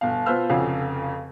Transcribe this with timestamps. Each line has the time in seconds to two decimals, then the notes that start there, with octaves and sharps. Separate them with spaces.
0.01 G1 B2 F5
0.26 B2 F4 B4 C5 E6 F6
0.49 F1 F2 C#3 F#4 G#4 F5